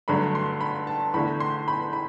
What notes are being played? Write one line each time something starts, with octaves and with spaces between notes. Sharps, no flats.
G2 D3 F#3 A3 B5
C6
B5
A5
E2 D3 A3 B5
C6
B5
B5